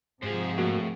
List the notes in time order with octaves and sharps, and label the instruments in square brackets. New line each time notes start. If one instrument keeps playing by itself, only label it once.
[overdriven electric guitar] G#2 [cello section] C3 F3 G#4 [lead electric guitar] F4 C5
[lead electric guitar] A2 [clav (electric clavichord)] A#3 F#4